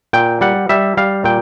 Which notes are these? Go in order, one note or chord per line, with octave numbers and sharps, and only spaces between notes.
A#2 G5
G3 F#5
G3 E5
G3 F5
A#2 G5